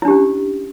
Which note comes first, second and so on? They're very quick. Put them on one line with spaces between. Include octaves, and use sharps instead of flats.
E4 D4 G4 C#4